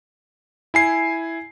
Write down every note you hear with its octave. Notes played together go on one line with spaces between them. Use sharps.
E4 G#5 C7